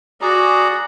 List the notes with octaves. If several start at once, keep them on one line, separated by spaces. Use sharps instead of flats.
F#4 G#4 D5 A#5